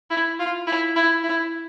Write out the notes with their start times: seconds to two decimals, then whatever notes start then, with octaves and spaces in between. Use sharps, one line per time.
0.10 E4
0.39 F4
0.67 E4
0.96 E4
1.24 E4